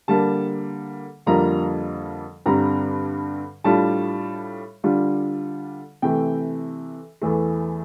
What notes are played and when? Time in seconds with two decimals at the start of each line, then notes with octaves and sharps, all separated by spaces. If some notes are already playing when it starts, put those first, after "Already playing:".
0.08 D3 G3 A#3 A5
1.26 F2 D3 G3 A#3 F4 A#5
2.46 G2 D3 G3 C4 A#5
3.64 A2 G3 D4 F4 A5
4.84 D3 G3 D4 F4
6.02 C3 E3 A3 G5
7.22 E2 E3 A3